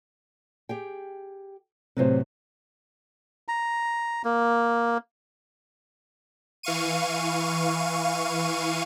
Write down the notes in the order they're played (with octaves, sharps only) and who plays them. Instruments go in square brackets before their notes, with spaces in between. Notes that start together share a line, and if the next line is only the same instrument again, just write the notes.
[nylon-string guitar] G4 G#4 G5
[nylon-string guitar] A2 F#3 B4 [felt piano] C3 C5
[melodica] A#5
A#3
[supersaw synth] E3 F5 C#6 D#7